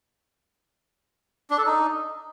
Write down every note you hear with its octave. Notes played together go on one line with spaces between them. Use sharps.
D4
A4
D#4